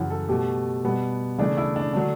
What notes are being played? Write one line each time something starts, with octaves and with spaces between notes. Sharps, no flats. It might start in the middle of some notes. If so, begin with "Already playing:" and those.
Already playing: F#2 C#3 E3 F#5
A4
B2 A3 G4
B2 G3 B3
C#3 E3 A3 D4
E4
D4
D3 F#3 A3 D4